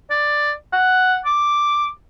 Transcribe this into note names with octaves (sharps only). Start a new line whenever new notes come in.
D5
F#5
D6